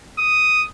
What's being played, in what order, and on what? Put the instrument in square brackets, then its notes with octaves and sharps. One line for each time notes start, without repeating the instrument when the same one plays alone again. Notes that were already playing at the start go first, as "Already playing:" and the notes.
[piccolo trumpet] D#6